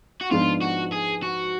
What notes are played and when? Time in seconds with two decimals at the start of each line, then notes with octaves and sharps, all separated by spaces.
0.21 F#4
0.31 G#2 F3 B3 D4 F4
0.61 F#4
0.92 G#4
1.23 F#4